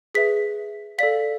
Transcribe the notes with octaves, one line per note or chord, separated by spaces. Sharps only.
G#4 B4 E5 B6
A4 D5 F5 B6